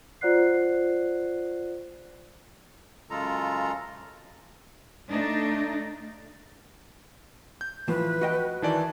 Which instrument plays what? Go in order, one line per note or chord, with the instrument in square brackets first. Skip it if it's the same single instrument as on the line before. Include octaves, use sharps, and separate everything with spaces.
[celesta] F4 C5 D5 F#5 F#6 C7
[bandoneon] F#2 C#3 G#3 F4 A4 A#5
[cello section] A3 D4 D#4
[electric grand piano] G6
[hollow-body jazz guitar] A2 E3 F3 [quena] B4
[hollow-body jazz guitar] F#4 D#5 G5
[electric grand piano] D#3 E3 D5 [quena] A5